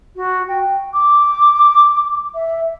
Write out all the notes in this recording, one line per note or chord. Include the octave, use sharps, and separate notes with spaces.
F#4
G5
D6
E5